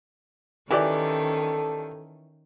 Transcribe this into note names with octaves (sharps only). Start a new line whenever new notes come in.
D#3 E3 C#4 E4 G4 A4 D5